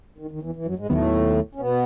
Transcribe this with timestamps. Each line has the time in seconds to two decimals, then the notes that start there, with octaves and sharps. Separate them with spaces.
0.18 D#3
0.31 D#3
0.42 E2 E3
0.56 E3
0.66 F#2 F#3
0.78 G#2 G#3
0.90 D#2 A2 D#3 F#3 A3 B3
1.55 C#4
1.60 B2 B3